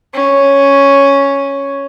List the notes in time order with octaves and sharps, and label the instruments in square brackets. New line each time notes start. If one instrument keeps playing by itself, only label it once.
[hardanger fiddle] C#4